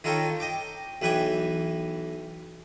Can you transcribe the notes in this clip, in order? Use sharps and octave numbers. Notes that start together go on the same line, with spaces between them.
D#3 F4 A4 A#4 C#5 G5
D#5 G5 D6
B1 E3 B4 G5 G#5 D6